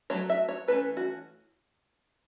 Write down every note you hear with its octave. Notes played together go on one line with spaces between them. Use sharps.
F#3 A3 C#5
E5
C#5
E3 A3 C#4 B4
F#4